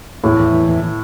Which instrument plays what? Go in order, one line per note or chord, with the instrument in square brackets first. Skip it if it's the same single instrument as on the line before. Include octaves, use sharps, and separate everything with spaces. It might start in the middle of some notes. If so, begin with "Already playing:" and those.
[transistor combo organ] E2 [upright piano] A2
[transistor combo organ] E2
E3
E2